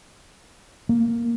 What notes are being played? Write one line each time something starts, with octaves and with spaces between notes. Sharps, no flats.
A#3